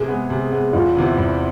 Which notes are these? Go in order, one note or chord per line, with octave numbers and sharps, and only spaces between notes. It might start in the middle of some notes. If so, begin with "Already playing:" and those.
Already playing: C3 G#4
G#3 B3
C3
G#3 B3
E2 F4
C3 E3 B3
E2